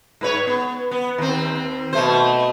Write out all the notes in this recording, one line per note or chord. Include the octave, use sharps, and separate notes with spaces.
G#2 B4 C#5
B3
B3
D#2 C4
B2 A3 C5